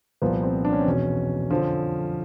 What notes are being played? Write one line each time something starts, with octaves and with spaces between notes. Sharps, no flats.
C2 A#2 F3 B3
C4
D4
C#4
C4
E2 B2 C#4
F2 D3 F3